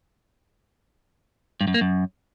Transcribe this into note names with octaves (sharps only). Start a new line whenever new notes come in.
G2
F#2
A#3
F#2